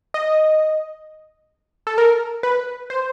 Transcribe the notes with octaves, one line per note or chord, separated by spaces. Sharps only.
D#5
A4
A#4
B4
C5